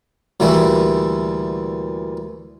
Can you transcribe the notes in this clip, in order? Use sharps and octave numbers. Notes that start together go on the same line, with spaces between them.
D2 A#2 E3 G3 E4